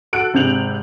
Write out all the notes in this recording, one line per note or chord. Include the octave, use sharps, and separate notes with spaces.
F#4 A4 F#6 D7
G#1 C3 C5 G6 F7 F#7